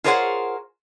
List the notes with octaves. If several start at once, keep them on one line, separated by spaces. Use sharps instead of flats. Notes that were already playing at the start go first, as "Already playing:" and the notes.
F4 G#4 A#4 C5 C#5 F#5